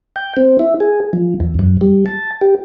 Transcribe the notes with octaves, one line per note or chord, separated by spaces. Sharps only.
G5
C4
E4
G#4
F3
E2
F#2
G3
A5
G4